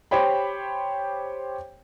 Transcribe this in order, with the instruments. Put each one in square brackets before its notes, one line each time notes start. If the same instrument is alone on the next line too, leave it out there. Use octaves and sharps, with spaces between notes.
[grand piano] G4 C5 C#5 G5 B5